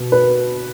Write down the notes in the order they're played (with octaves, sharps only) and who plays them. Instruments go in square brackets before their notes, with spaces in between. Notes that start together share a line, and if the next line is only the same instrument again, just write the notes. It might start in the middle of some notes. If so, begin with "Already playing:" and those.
Already playing: [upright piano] B2
B4